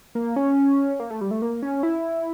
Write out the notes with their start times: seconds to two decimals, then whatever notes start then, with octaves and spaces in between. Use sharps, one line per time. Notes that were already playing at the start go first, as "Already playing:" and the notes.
0.15 A#3
0.36 C#4
1.00 A#3
1.10 A3
1.21 G3
1.31 A3
1.42 A#3
1.62 C#4
1.83 E4